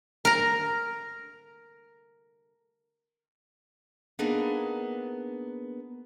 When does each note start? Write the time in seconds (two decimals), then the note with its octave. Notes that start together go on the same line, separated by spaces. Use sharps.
0.25 A#4 A#5
4.19 A#3 B3 D4 D#4 G#4